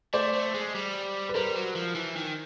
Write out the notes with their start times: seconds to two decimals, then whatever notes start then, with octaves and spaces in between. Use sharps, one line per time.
0.14 A3 C5 D5
0.33 A3
0.54 G#3
0.75 G3
1.29 B4
1.35 G3 A#4 C5
1.56 F#3
1.76 F3
1.95 E3
2.16 D#3